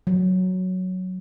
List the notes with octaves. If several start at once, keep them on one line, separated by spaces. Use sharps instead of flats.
F#3